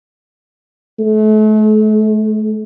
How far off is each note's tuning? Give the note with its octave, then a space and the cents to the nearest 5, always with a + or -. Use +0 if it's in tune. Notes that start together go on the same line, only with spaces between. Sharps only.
A3 -35